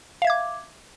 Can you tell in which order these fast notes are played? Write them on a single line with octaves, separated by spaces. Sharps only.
F5 E5 G#6 D6